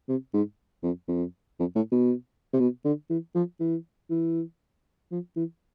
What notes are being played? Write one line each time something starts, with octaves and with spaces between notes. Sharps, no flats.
C3
G#2
F2
F2
F2
A2
B2
C3
B2
D3
E3
F3
E3
E3
F3
E3